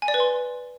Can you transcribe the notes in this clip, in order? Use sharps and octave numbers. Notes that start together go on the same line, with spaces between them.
G#5
D5
B4
C6